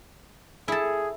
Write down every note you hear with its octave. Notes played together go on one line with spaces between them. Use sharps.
E4 G#4 A4